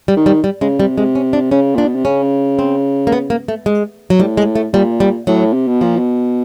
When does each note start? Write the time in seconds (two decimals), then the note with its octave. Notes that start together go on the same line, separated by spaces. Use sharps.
0.08 G3
0.16 D#3
0.26 G3
0.44 G3
0.61 C#3 G#3
0.80 C3 G3
0.98 C3 G#3
1.15 C#4
1.33 D4
1.51 C#3 C#4
1.75 A#2 D4
1.85 B2
1.95 C3
2.05 C#3 C#4
2.59 C4
3.07 A#3
3.12 B3
3.30 A#3
3.48 A3
3.66 G#3
4.10 F#3
4.19 A2 G3
4.37 G#3
4.55 A3
4.73 A#2 G3
5.00 G3
5.27 A2 F#3
5.53 C3
5.67 B2
5.81 A#2 F3
5.97 B2